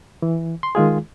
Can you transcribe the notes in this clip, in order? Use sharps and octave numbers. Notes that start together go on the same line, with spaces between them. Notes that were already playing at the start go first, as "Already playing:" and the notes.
E3
C6
D#3 G#3 F4 G#4